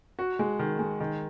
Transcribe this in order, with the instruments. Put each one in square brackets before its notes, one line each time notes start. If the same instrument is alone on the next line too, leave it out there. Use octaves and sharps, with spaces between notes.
[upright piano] F#4
G#3
D#3
G#3
D#3